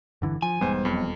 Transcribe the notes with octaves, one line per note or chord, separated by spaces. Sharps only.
G1 D3 E3
F3 G#5
E1 G#2 G3 B3 C5
B1 F2